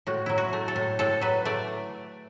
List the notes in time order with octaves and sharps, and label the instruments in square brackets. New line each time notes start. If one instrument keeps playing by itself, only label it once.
[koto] A2 F#4
F#3 E4
F#4
A3
A4
A2
A2 A4
F#3 B4
A3 D5